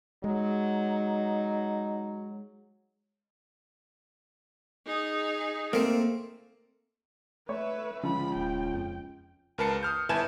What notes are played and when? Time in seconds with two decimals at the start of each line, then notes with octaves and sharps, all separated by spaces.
0.24 F#3 G#3 D#4
4.87 D#4 G#4
5.73 A3 A#3 C4
7.49 A3 B4 C#5 E5
8.03 C#2 D3 F3 B5
8.36 D#1 G5
8.74 F2
9.58 C#2 A#4 B4 A5 C7 C#7
9.83 D#6 F6 G6
10.09 G1 E4 B4 G#5 A5 E7